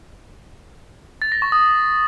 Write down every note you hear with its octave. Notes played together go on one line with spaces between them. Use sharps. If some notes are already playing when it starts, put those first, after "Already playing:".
A6
A#6
C#6
D#6